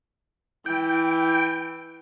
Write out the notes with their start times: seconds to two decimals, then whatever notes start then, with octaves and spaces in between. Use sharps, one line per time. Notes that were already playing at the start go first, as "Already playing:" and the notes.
0.66 E3 G5